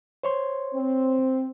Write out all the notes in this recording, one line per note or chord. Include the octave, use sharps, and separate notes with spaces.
C5 C#5 C6
C4